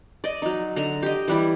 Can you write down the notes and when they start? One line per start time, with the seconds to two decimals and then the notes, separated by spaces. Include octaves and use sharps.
0.24 D5 D#5
0.42 F#3 D#4
0.76 D3 A#5
1.02 G4 D#5
1.28 E3 G3 E4